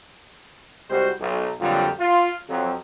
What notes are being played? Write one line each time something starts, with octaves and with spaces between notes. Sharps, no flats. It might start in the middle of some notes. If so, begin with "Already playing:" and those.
C2 G3 G#3 F#4 C5
B1
F2 A#2 D3 F#3 G3 F4
F4
F2 F#3